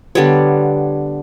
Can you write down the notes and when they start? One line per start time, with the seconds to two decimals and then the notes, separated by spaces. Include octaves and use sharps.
0.15 D3 G3 B3 C#5